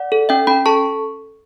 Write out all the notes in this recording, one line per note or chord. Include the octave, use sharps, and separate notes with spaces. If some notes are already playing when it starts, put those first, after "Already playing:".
Already playing: D5 F#5
A4
C#4 E5 G5
C#4 G5 B5
A4 A5 C#6